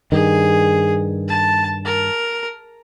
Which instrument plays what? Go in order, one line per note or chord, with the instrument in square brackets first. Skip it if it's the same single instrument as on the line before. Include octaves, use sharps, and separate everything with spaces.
[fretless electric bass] G2 D#3 [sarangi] G#4
[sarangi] A5
A#4